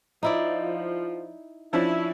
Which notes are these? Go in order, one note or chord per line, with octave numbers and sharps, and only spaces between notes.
F3 D#4 E4 D5
F3 C#4 D4 E4